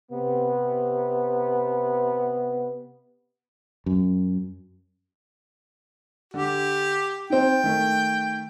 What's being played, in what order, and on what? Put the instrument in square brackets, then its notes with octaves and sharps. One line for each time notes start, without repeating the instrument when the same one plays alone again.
[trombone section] C3 B3
[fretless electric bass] F#2
[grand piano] D3 [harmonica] G4
[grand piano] C4 D#4 [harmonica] G5
[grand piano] D#3 A3